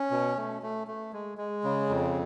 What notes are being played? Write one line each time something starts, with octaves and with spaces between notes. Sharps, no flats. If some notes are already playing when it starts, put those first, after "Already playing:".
Already playing: C#4
B2
A3
A3
A3
G#3
G#3
C#3
F2